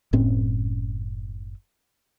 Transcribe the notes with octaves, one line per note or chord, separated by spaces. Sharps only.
F#1 A2 C4 C#4